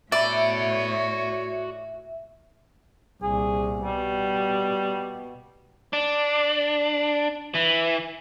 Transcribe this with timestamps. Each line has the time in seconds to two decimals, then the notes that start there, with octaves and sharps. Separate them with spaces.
0.12 A2 F#4 C#5 D5 E5 B5
3.22 C2 A#2 G#4
3.83 B2 G3
5.93 D4
7.55 E3